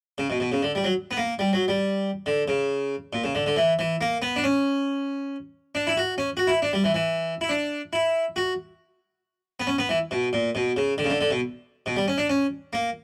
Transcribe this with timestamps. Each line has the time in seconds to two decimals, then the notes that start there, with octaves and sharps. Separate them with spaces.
0.18 C#3
0.30 B2
0.40 B2
0.52 C#3
0.62 D3
0.75 G3
0.84 F#3
1.11 B3
1.17 A#3
1.39 G3
1.53 F#3
1.68 G3
2.26 D3
2.48 C#3
3.13 A#2
3.24 C#3
3.35 D3
3.46 D3
3.56 E3
3.79 E3
4.01 A#3
4.22 B3
4.36 D4
4.44 C#4
5.75 D4
5.87 E4
5.97 F#4
6.18 C#4
6.37 F#4
6.47 E4
6.62 D4
6.73 G3
6.84 E3
6.94 E3
7.41 E4
7.49 D4
7.93 E4
8.36 F#4
9.60 B3
9.67 C#4
9.78 B3
9.89 E3
10.11 B2
10.33 A#2
10.55 B2
10.77 C#3
10.98 D3
11.04 C#3
11.10 D3
11.21 D3
11.31 B2
11.86 B2
11.96 G3
12.08 C#4
12.18 D4
12.29 C#4
12.73 A#3